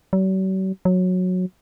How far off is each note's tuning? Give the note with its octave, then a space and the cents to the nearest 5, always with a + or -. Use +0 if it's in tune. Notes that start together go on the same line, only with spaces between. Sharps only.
F#3 +45
F#3 -15